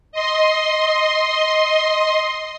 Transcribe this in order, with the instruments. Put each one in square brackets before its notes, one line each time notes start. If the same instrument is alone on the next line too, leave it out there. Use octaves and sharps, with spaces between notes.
[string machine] D#5 C6